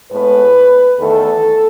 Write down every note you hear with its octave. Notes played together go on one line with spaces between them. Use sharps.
A2 G#3 B3 B4
E2 D#3 A3 A4